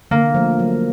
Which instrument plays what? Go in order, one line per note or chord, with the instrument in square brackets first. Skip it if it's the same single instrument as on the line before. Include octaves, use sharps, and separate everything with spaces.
[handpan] D3 [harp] A#3
[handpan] F3 A3
F#3